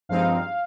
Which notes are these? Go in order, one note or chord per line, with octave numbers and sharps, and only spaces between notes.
G2 F3 G#3 C4 D#4 F5